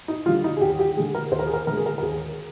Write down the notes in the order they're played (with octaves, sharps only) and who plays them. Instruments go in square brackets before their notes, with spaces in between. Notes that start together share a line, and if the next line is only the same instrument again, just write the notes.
[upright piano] D#4
D3 G3 F4
D#4
G#4
D#2 G4
G4
D3 G#3 G#4
A#4
D#2 C5
A#4
G#4
A#4
D3 G#3 A#4
G#4
A#4
A#4
D#2 G#4